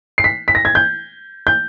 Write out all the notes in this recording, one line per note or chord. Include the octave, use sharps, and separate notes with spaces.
C7
B6
B6
A#6
G#6
G6
G6